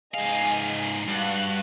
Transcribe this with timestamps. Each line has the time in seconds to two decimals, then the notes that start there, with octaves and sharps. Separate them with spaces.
0.14 G#2 G#4 D#5 F5 G#5
1.08 G2 F#4 F5 F#6